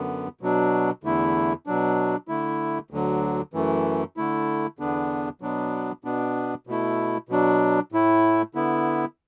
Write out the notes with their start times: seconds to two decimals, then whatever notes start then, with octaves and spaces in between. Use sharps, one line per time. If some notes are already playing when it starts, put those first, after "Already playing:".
Already playing: F#2 D3 B3
0.41 B2 F#3 D4
1.04 E2 D3 A3 E4
1.66 B2 F#3 D4
2.28 D3 A3 E4
2.91 D2 D3 F#3
3.54 F#2 E3 A3
4.17 D3 A3 E4
4.79 E2 D3 B3 D4
5.41 B2 F#3 B3 D4
6.04 B2 B3 D4
6.67 B2 A3 E4
7.29 B2 F#3 D4
7.92 A2 A3 E4
8.55 D3 B3 E4